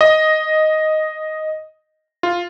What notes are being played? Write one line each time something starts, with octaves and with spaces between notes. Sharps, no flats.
D#5
F4